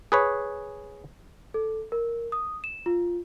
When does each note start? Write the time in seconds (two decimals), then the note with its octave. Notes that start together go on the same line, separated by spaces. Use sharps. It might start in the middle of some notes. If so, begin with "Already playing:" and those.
0.12 G#4 B4 C#5
1.54 A4
1.92 A#4
2.32 D#6
2.64 E7
2.86 F4